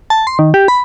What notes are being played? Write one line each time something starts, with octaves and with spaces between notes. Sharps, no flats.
A5
C6
D#3
G4
B5